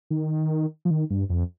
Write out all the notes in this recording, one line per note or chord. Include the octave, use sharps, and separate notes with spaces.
D#3
F3
D#3
G2
F2